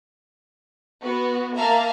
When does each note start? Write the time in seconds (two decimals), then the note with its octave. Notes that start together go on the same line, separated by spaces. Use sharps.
1.02 B3 F#4
1.57 A#3 E5 F5 A5 A#5